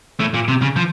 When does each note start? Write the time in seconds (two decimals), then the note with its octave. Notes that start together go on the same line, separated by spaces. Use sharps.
0.20 A2
0.34 A#2
0.48 C3
0.62 C#3
0.76 F3